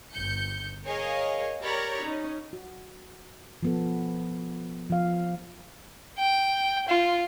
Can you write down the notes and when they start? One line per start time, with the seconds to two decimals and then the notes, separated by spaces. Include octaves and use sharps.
0.13 G1 G6 C#7
0.86 G#4 A#4 C#5 D#5 F5
1.63 G4 A#4 C#5 D5 A#5 B5
2.02 C#4 D#4
2.53 F#4
3.63 F3 B3 A4
4.90 F3 F5
6.18 G5
6.89 F4